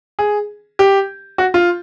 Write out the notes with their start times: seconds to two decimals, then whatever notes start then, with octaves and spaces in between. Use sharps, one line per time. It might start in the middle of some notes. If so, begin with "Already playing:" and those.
0.19 G#4
0.79 G4
1.38 F#4
1.54 F4